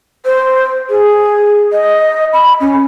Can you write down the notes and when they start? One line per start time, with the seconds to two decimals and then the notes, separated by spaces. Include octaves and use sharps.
0.25 C5
0.90 G#4
1.72 D#5
2.33 B5
2.61 C#4